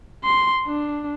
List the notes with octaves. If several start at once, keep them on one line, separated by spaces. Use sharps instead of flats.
C6
D4